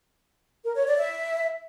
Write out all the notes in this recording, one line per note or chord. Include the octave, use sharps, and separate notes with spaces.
A#4
C#5
D5
E5